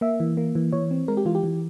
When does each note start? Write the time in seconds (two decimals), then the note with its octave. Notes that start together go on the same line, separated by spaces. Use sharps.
0.01 A#3 E5
0.20 E3
0.37 A#3
0.55 E3
0.72 E3 C#5
0.91 C4
1.08 G#3 A#4
1.17 G4
1.25 E3 F4
1.35 G4
1.43 E3